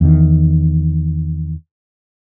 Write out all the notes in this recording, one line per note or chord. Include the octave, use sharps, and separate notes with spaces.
E2 D#3